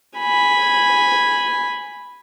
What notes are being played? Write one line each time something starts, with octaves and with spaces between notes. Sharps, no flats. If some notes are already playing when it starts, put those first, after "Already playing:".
G#5 B5